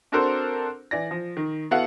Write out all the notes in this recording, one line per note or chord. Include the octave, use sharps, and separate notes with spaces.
C4 D4 F#4 A4 A#4 C5
E3 D5 A#6
F3
D#3
B3 E4 F#4 A4 F5 F#5